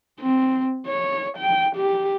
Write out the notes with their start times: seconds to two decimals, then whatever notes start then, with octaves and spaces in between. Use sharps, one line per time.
0.20 C4
0.87 C#5
1.38 G5
1.76 G4